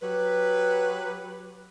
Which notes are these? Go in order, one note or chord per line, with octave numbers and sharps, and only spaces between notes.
F#3 G4 B4